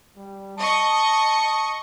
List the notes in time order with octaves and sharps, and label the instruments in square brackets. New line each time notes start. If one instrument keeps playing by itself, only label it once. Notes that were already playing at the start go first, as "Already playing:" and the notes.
[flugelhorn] G3
[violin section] D#5 C#6 [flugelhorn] A5